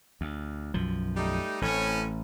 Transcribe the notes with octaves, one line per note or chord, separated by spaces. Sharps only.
D2
B1 F#2 F3
G3 A3 D#4
A1 A2 C4 C#4